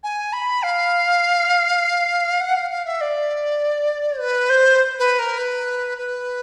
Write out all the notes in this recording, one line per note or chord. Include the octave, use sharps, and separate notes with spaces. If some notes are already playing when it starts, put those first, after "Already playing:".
G#5
B5
F5
F#5
F5
F5
E5
D5
B4
C5
B4
A#4
B4
B4